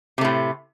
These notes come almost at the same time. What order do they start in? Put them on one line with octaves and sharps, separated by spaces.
C3 A3 A2